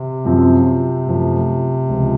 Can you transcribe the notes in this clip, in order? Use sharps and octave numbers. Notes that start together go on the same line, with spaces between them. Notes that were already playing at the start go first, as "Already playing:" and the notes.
Already playing: C3
F#2 F3 C4 F4
F#2 F3 A3
C#2 C#3 F3